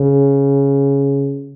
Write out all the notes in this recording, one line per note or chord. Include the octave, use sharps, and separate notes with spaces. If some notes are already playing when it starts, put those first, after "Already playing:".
Already playing: C#3